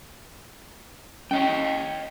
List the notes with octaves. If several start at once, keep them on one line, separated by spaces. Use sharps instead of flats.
C#4 C#5 D#5 G5